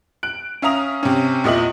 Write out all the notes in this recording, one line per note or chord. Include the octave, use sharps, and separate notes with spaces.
F#6 D7
C#4 E5 F5 A#5 D#6 F7
C3 C4 C#4
E2 A#2 D#5 E5 F#7